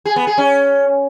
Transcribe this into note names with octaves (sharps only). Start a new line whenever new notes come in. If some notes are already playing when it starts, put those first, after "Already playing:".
G#4
B3
G#4
C#4